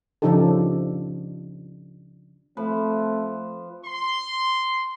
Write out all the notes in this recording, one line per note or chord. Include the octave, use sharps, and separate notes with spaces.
C#3 F3 D4 D#4 G4 A4
F3 A3 C4 B4
C6